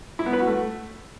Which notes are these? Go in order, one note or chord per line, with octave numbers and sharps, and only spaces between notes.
E4
B3
B4
F#4
A3